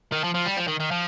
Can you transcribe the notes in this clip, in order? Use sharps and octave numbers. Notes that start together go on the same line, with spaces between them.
D#3
F3
F3
G3
F3
D#3
D#3
F3